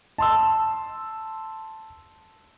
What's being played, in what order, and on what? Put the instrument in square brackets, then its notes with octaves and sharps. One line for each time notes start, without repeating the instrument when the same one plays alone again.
[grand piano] A5 C6 E6